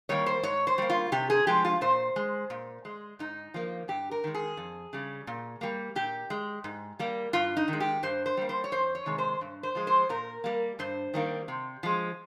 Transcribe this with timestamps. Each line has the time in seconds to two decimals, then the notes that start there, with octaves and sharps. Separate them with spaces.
0.09 D#3 G3 A#3 C#5
0.26 C5
0.43 G#2 C#5
0.67 C5
0.78 G3 A#3
0.90 F4
1.12 C3 G4
1.30 G#4
1.47 F3 G#3 G4
1.65 F4
1.81 A#2 C5
2.16 G#3
2.50 A#2
2.85 G#3
3.19 G#2 D#4
3.54 F3 A#3
3.88 G2 G4
4.11 A#4
4.24 D#3 G#3
4.35 G#4
4.57 F2
4.93 C#3 G3
5.27 A#2
5.61 G3 A#3
5.96 A#2 G4
6.30 G#3
6.64 G#2
6.99 G3 A#3
7.33 G2 F4
7.57 D#4
7.68 D#3
7.73 G#3
7.80 G4
8.03 G2 C5
8.26 C5
8.37 G3 A#3
8.49 C5
8.64 C#5
8.72 F2 C5
8.95 C#5
9.06 C3 D#3 G#3
9.18 C5
9.41 G2
9.63 C5
9.75 F3 G#3
9.87 C5
10.09 A#2 A#4
10.44 G3 A#3
10.79 G2 C5
11.14 D#3 G3 A#3
11.48 C3
11.83 F3 G#3